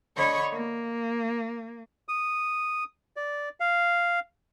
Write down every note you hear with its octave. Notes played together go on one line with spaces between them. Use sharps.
D3 C#5 D#5 B5 C#6
A#3
D#6
D5
F5